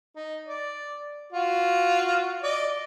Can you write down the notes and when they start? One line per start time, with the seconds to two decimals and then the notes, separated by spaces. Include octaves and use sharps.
0.16 D#4
0.46 D5
1.33 F4 F#4
2.43 D5 D#5